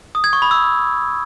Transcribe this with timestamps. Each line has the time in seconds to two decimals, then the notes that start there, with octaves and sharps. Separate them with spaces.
0.15 D#6
0.24 G#6
0.33 C#6
0.42 B5
0.51 E6